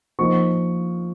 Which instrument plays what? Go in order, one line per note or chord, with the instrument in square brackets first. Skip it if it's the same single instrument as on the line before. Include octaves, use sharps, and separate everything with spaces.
[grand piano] F3 A#3 D#4 C#6